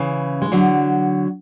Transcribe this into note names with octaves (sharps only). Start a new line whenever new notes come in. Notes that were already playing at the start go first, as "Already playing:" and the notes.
Already playing: C#3 E3
G#3
D3 F#3